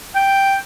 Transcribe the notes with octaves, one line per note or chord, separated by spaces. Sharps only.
G5